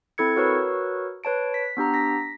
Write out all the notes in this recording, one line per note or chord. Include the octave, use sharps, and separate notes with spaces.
C4 E4 A4 G#6 C#7
F#4 A#4 B4 C#5 C#6 E6
B4 C#5 A5 D7
B6
B3 D4 G4 A#5
A#6 B6